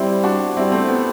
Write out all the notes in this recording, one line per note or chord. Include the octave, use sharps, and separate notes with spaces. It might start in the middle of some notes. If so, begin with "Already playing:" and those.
Already playing: G3 C4 E4
D4 F#4
G3 C4 E4
A3 C4
B3